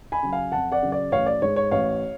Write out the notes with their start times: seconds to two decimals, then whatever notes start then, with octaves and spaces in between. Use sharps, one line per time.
0.12 G#5 B5
0.23 C#3 F#3
0.33 F5 G#5
0.52 F2 F#5 A5
0.72 D5 F#5
0.83 C#3 F#3
0.92 D5
1.12 A1 C#5 F5
1.26 D5
1.42 G#2 G#3 C#5
1.56 C#5
1.71 A1 C#5 F5